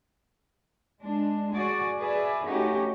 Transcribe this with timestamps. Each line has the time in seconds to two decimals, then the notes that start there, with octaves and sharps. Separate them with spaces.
1.02 G#3 D4
1.53 F#4 G#4 D5
1.99 G#4 B4 D5 E5
2.47 A3 C#4 D#4 F#4 G4